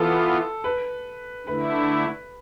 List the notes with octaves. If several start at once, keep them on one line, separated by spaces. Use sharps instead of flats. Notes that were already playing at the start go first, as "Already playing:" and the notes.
Already playing: E3 B3 F4 A4
B4
D3 A3 E4 B4